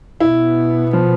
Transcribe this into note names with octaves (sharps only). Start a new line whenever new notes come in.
B2 B3 E4
F3